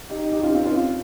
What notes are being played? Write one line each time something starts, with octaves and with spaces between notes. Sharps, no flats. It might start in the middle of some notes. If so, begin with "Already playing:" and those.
D#4 G4
D#4 G4
C#4 F4
C4 D#4
C#4 F4